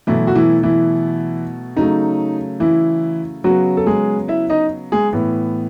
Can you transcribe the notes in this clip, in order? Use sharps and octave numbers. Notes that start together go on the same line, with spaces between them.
B2 E3 F#3 A3 E4
F#4
E3 E4
E3 E4
C#3 F#3 A3 D#4
E3 E4
C#3 F#3 B3 F#4
A4
G#3 G#4
E4 E5
D#4 D#5
G#3 G#4
A2 E3 B3